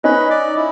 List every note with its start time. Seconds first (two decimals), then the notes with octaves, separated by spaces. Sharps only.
0.04 C#4 D#4 B4
0.30 D5
0.56 E4